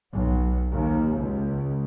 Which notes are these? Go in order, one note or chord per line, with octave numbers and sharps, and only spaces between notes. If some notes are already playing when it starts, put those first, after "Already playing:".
B1
D#2
C#2